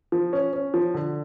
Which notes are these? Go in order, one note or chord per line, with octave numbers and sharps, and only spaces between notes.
F3
C#4
C#4
F3
D3